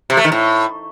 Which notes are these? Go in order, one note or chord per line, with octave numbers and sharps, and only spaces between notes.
C3
A3
D#3
A2